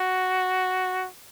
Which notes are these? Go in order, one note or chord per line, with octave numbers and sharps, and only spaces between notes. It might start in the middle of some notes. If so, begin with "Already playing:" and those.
Already playing: F#4